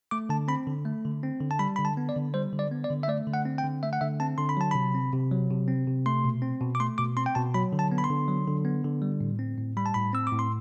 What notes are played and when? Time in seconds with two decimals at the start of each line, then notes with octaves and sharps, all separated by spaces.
0.11 A3 D6
0.29 D3 A5
0.48 C4 B5
0.67 D3
0.85 A3
1.05 D3
1.23 C4
1.41 D3
1.51 A5
1.59 G3 B5
1.76 D3 B5
1.85 A5
1.97 B3
2.09 D5
2.16 D3
2.34 G3 C5
2.53 D3
2.59 D5
2.71 B3
2.84 D5
2.90 D3
3.03 E5
3.08 A3 D5
3.27 D3
3.34 F#5
3.45 C4
3.58 G5
3.64 D3
3.83 A3 E5
3.93 F#5
4.01 D3 E5
4.20 C4 A5
4.38 D3 C6
4.49 B5
4.57 F#3 A5
4.71 C3 B5
4.95 C4
5.13 C3
5.32 F#3
5.50 C3
5.68 C4
5.87 C3
6.06 A3 C6
6.24 B2
6.42 C4
6.61 B2
6.75 D6
6.80 A3 C6
6.98 B2 D6
7.17 C4 C6
7.26 G5
7.35 B2 A5
7.54 F#3 B5
7.73 D3
7.79 A5
7.92 B3
7.98 B5
8.04 C6
8.10 D3
8.28 F#3
8.47 D3
8.65 B3
8.84 D3
9.02 G3
9.21 A2
9.39 C4
9.58 A2
9.77 G3 B5
9.86 A5
9.94 A2 B5
10.13 C4 E6
10.27 D6
10.32 A2
10.39 C6